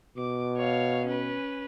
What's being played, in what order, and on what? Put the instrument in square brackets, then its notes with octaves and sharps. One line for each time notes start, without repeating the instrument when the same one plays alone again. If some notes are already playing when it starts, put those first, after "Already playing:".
[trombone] B2 [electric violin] D6
[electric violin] C#5 F5
C#4 B4